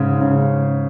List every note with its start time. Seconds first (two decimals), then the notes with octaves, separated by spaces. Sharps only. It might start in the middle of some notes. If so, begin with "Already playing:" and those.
Already playing: G#2 C#3
0.21 C#3